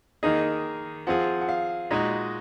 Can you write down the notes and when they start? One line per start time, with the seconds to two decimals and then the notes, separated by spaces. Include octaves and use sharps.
0.23 D#3 A#3 D#4 G#4 D#5
1.07 F3 C4 F4 G#4 F#5
1.42 F#5
1.49 F5
1.91 A#2 G#3 D#4 F#4 D#5